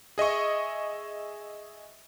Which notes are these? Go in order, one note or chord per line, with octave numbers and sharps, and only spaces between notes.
G#4 D#5 E5 C#6